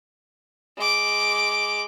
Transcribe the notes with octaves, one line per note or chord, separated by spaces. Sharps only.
G#3 D6